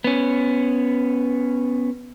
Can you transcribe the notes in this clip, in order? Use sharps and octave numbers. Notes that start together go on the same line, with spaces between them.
B3 C#4